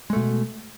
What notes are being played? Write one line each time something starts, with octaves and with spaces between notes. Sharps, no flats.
B2 G#3 A3